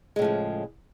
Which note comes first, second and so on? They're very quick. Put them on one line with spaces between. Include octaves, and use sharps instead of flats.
G#3 A2 F3 C#3